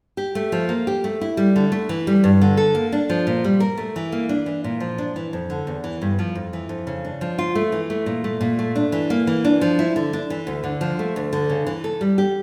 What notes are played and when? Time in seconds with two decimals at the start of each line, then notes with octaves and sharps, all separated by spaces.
0.17 G4
0.35 A3
0.52 F3
0.69 A#3
0.87 G4
1.04 A3
1.21 E4
1.37 G3
1.56 D3
1.72 A3
1.89 E3
2.07 G3
2.24 G2
2.41 D3
2.57 A4
2.75 A#3
2.92 D4
3.09 F3
3.27 A#2
3.44 G3
3.60 A#4
3.77 A3
3.96 E3
4.12 A#3
4.29 D4
4.46 E3
4.64 A#2
4.80 F3
4.98 D4
5.16 E3
5.33 F2
5.50 D3
5.67 E2
5.84 E3
6.02 G2
6.19 F3
6.35 F2
6.53 E3
6.69 F2
6.87 C#3
7.05 D4
7.21 F3
7.39 F4
7.55 A3
7.72 E3
7.90 A3
8.06 A#2
8.24 A3
8.41 A#2
8.59 A3
8.76 D4
8.92 E3
9.10 A#3
9.27 E3
9.45 D4
9.61 F3
9.79 E4
9.96 D3
10.13 D4
10.30 E3
10.47 D2
10.64 D3
10.81 F3
10.99 A3
11.16 D2
11.33 D3
11.50 C#3
11.67 E3
11.84 A4
12.01 G3
12.18 G4